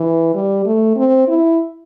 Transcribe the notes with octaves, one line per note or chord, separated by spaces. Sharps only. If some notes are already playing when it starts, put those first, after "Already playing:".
Already playing: E3
G3
A3
C4
E4